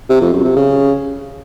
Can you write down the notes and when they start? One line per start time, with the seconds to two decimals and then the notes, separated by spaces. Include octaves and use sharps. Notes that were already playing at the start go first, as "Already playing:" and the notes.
0.09 C3
0.21 F2
0.33 F#2
0.44 C3
0.56 C#3